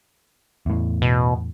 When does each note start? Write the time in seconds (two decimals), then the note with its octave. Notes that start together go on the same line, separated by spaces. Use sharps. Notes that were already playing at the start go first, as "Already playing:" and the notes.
0.66 E2 A2
1.02 B2